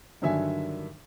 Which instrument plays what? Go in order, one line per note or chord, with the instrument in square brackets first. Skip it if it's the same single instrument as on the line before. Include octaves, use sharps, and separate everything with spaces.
[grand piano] G2 D3 D#3 F#3 E5 G#5